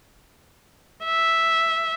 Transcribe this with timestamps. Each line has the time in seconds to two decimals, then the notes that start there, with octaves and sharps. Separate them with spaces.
1.05 E5